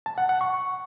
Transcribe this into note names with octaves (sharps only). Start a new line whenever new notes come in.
A5
F#5
F#5
C#6